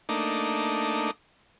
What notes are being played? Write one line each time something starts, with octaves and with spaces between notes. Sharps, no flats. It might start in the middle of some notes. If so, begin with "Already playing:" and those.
A3 A#3 D4 D#4